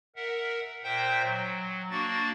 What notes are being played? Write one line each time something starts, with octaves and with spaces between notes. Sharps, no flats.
A#4 E5 F#5
A#2 C5 E5 G5 G6
F#3
A#3 D4 F#4 A6